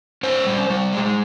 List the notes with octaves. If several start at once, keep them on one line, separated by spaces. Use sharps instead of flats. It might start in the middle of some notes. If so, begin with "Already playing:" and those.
C#4 C5
G3
G3
G#3